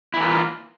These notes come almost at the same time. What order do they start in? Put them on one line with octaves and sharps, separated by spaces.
E4 E3 A#3 F4